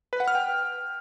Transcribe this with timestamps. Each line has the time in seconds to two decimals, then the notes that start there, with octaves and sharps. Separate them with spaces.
0.13 B4
0.20 F#5
0.28 F6
0.35 G5